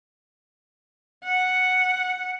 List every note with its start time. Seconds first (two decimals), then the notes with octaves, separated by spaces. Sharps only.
1.25 F#5